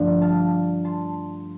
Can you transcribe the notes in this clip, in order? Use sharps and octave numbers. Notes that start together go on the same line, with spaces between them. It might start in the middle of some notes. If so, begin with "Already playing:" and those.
Already playing: G2 D3 F3 A3 D5
F5 A5
A5 C6